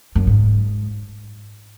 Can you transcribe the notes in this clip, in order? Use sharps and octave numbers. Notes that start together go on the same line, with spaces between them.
F#2
G#2